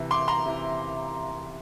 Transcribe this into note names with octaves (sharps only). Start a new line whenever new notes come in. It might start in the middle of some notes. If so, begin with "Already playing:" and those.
Already playing: C3 E3
C6 D6
A#5 C6
C3 E3